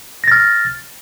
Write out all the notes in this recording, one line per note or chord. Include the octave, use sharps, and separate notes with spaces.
F6 A6 A#6